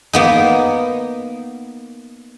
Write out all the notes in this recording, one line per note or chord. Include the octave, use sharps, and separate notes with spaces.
A#3 B3 D#4